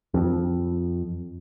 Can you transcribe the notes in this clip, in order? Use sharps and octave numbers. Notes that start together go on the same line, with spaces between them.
F2